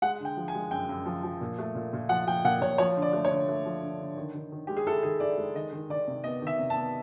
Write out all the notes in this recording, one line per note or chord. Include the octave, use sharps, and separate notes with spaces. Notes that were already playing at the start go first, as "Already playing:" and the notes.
G#3 F#5
D3 G5
F3
G#5
G#3
F#2 G5
F#2
F3
F3
A#2
A3
A#2
A#2
F3 F#5
F3 G5
A#2 F#5
A#2 C#5
F3 C#5
D3
D5
A3
C#5
D3
A3
F3
D3
D3
D#3
D#3
D#3
G#3 G4
G#4
E4 A4
D#3 G#4
E4 D5
G#3
D#3 D#5
D#3
D#3 D5
C3
B3 D#5
D#3 E5
C3
A5
B3